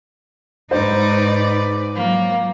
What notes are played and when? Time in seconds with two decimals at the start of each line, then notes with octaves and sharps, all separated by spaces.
0.71 G#2 D#4 B4 C5 D5
1.95 F3 F#3 A#3